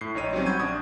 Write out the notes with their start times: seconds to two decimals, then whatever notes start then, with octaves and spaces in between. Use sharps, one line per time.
0.01 A2 C7
0.15 A#1 D#4 C#5 D#7
0.33 F#3 G3 C4 C#4
0.46 F#5 B5 C#6 G6 G#6 D#7
0.60 A#1 D4 D#6